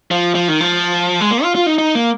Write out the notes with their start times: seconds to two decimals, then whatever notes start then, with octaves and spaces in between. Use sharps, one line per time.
0.11 F3
0.35 F3
0.48 D#3
0.60 F3
1.21 G#3
1.31 A#3
1.43 F4
1.55 F4
1.66 D#4
1.78 D#4
1.95 A#3